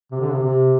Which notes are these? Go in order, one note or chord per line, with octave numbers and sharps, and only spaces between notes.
C3
D3
C3
C3